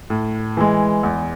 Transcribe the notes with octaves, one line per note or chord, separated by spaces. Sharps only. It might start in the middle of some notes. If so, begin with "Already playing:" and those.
A2
E3 G#3
E2